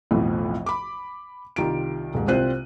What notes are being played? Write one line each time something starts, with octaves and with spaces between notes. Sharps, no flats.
B1 F2 A2 E3 F3
B5 D6
C2 D#3 F4 G4 D7
D#1 G#2
C2 C4 F4 C5 F#6 D#7